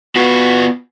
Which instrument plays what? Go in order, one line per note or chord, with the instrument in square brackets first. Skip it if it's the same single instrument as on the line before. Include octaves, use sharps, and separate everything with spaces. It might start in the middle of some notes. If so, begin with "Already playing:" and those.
[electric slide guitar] B3 F4 B4 [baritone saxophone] F#4